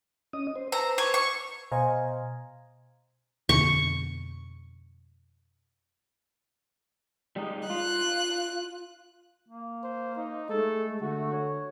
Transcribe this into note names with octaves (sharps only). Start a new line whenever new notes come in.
C#4 D#5 D#6
C5
B4 C5 A#5 E6
C#5
C#6
B2 C5 D#5 F5 G#5 A#5
F2 B2 D3 C#6
G3 G#3 D#4
F4 F#6
A#3
C5
D#4
G#3 A3 A4
D3 F#4
C#5